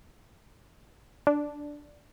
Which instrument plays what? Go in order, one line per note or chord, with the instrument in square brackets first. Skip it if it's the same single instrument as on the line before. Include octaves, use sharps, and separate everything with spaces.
[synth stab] D4